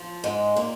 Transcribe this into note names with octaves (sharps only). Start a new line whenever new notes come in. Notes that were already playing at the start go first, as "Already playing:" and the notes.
Already playing: F3
G#2 G#3
A#2 A#3